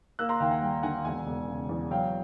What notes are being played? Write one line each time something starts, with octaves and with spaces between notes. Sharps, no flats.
A#3 E6 F#6
A#5 C6
D#2 F5 G5
F#5 G#5
G3 F5 G5
D3 F#5 G#5
E1 F#5 G#5
E1
C#3
E2
F#3 F5 G5